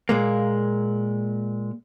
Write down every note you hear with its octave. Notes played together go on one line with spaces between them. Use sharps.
A#2 G#3 A#3